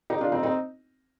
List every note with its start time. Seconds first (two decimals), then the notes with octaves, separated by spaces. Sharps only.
0.10 D#4 G4
0.21 D4 F4
0.32 C4 D#4
0.43 C4 D#4